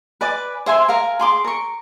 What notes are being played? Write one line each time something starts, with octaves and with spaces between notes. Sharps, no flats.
B4 D5 G#5 D6
C5 E5 G#5 C6
A#4 F5 G#5 A#5
G#4 C6 D6
A#4 C#6